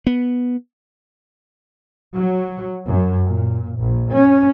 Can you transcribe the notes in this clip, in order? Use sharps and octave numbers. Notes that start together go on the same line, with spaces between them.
B3
F#3
F#2
A#2
A#1
C#4